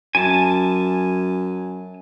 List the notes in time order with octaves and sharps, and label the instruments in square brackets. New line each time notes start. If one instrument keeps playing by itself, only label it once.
[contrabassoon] F#2 [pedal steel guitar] G#5 A5